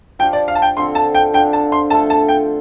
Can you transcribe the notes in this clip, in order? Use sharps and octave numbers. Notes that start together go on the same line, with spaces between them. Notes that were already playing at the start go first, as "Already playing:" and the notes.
F3 D4 G4 G5
D5
F5
A5
G5
D3 F3 C4 A4 C6
A5
G5
D3 F3 D4 G5
A5
C6
D3 A3 F4 A4 A5
A5
G5